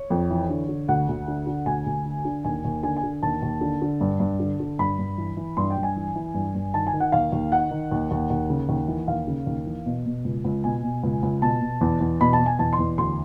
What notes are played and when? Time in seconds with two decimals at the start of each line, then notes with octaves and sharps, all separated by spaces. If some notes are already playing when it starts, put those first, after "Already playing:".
Already playing: C#5
0.10 F2
0.30 E3
0.49 D3
0.69 D3
0.88 D2 F#5
1.09 D2
1.28 D3
1.47 D3
1.66 D2 G#5
1.86 D2
2.05 D3
2.25 D3
2.44 D#2 G#5
2.65 D#2
2.83 D3 G#5
2.97 G#5
3.03 D3
3.23 D#2 A5
3.42 D#2
3.61 D3
3.82 D3
4.01 G2
4.20 G2
4.40 D3
4.60 D3
4.79 G2 B5
4.99 G2
5.18 E3
5.37 E3
5.57 G2 C6
5.70 G5
5.77 G2
5.83 G#5
5.96 E3
6.15 E3
6.34 G2
6.55 G2
6.74 D#3 A5
6.87 G#5
6.93 D#3
7.00 F#5
7.12 D#2 F5
7.32 D#2
7.52 D#3 F#5
7.71 D#3
7.91 D#2
8.11 D#2
8.30 D#2
8.50 C#3
8.69 D#2
8.88 E3
9.08 D#2 F5
9.27 C#3
9.47 D#2
9.66 E3
9.86 B2
10.06 B2
10.24 C#2
10.44 C#2
10.64 B2 G#5
10.83 B2
11.03 C#2
11.23 C#2
11.42 B2 A5
11.61 B2
11.81 E2
12.01 E2
12.20 B2 B5
12.33 A5
12.40 B2
12.46 G#5
12.59 E2 A5
12.73 C6
12.79 E2
12.98 D2 C6